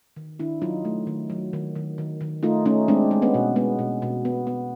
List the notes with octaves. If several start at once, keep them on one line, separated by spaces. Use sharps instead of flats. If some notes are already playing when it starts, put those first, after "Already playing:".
D#3
D#3 D4 E4
F#3 D#4 F4
A3
D#3
F#3
D#3
D#3
D#3
D#3
A3 D#4 F4
A3 C#4 D#4
G#3 C4 D4
G#3
B3 C#4
B2
G#3 B3
B2
B2
B3
B3